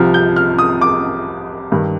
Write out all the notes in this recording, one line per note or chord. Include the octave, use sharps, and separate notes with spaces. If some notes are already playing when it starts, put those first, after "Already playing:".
Already playing: C2 C3 F3 F6
G6
F6
D#6
D6
G2 D#3